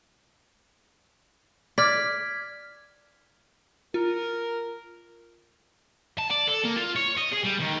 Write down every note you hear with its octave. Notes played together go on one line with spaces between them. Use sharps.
D5 F6 G#6 B6
F4 A#4
A5
D5
A4
A#3
F4
C#5
D#5
G#4
G3
D#2